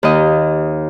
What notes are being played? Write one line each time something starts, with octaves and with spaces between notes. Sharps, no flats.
D#2 D#5